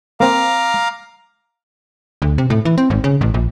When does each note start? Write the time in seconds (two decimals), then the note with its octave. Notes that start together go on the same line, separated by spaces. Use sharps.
0.20 A#3 C4 F5 A#5 D6
2.22 D2
2.38 C3
2.50 A2
2.65 E3
2.78 C4
2.90 G#1
3.04 C#3
3.21 A1
3.34 A#1